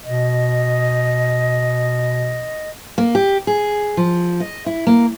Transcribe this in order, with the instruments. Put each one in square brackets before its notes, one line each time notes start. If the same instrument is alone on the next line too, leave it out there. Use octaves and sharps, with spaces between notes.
[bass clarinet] B2 [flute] D#5
[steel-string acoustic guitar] A#3
G4
G#4
F3
D#5
E4
A#3